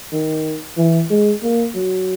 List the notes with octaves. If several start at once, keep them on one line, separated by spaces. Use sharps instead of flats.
D#3
E3
G#3
A#3
F#3